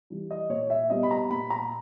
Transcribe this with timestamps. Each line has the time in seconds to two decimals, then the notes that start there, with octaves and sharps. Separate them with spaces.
0.10 E3 G3
0.31 D#5
0.49 A#2 C#5
0.70 E5
0.90 G3 B3 D#5
1.03 B5
1.11 A#5
1.30 A#2 B5
1.50 A#5